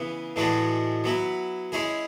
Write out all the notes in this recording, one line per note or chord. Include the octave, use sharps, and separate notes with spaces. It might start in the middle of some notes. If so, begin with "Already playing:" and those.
Already playing: C#3 E3 B3
A2 E3 G#3 D4 F#4
F#3 B3 E4
G#3 C#4 E4 G#4